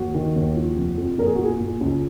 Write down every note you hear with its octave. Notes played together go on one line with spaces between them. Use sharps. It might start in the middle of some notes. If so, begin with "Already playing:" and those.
Already playing: D#2 F#4
D#3
D#2
F3
F1
F2
A#2 A#4
G#4
F#4
A#2 G#4
A#2
C#2